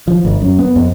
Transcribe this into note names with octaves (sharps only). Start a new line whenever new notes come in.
F3
G1
F#2
B3
F2